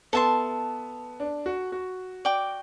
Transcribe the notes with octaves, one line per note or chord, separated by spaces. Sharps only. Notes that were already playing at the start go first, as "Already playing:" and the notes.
B3 A4 E5 A5 C6
D4
F#4
F#4
D5 G5 D6